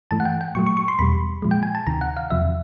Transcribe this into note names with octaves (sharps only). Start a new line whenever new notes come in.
G2 E3 A3 A5
F#5
G5
G5
A#2 F#3 A3 C#6
C#6
C#6
C6
E2 B2 G3 B5
A#2 F3 G#3
G5
G#5
A5
D2 C3 D#3 A#5
F#5
F5
E2 C3 F3 E5